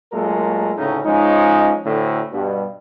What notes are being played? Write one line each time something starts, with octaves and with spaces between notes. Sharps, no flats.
A#2 F#3 G#3 A3 A4 A#4
D2 A2 C#3 C#4 D#4 E4
F3 G#3 C#4 D#4
D2 A2 D3
G2 B2